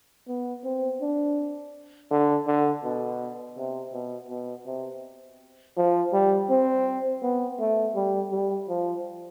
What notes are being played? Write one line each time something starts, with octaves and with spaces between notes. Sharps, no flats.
B3
C4
D4
D3
D3
B2
C3
B2
B2
C3
F3
G3
C4
B3
A3
G3
G3
F3